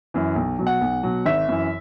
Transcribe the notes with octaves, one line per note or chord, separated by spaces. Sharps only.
F#2 E3
B1
B2 F#3
F#5
B1
B2 F#3
G#1 E5
F#2 E3